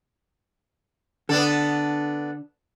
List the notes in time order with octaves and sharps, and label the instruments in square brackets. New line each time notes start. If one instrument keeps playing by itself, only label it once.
[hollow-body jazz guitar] D3 [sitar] B3 D4 A4